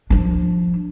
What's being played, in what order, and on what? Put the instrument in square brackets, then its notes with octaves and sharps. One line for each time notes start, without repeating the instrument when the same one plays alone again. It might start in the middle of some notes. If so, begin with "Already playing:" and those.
[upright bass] F3 D4